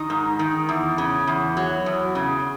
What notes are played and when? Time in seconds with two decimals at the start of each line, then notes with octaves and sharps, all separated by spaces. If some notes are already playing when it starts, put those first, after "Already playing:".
Already playing: D#3 D#4
0.10 G#2
0.39 D#3
0.69 E2
0.98 C#3
1.27 E2
1.57 F#3
1.86 E2
2.15 C#3